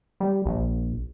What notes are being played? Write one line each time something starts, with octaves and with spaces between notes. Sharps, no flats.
G3
A#1